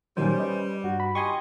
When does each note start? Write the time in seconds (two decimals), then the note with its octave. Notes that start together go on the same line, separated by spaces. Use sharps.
0.17 A#2 D#3 F#3 G3 C#4 C5
0.40 B4 D#5
0.84 G2 F#4
1.00 B5
1.15 D#2 F4 G4 D#5 G#5 C6 C#6